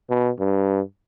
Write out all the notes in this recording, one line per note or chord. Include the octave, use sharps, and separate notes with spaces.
B2
G2